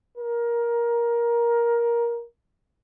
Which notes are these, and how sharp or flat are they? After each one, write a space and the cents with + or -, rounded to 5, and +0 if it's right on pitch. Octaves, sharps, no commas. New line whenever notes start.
A#4 +15